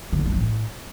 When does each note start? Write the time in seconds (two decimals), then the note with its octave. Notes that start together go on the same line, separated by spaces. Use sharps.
0.13 D3
0.19 G#3
0.26 G3
0.32 F3
0.39 A2